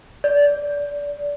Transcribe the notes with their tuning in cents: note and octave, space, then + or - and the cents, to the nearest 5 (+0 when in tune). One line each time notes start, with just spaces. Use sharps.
D5 -20